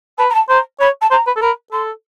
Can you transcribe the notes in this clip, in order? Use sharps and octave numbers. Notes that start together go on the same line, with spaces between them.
B4 A5
A#5
A5
C5 A#5
C#5 B5
A5
C5 A#5
B4
A4
A#4 B5
A4 C6